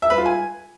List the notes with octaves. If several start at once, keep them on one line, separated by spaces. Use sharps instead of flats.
E5
B4
F4
G#5